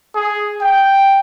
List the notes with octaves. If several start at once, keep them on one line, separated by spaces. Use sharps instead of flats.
G#4
G5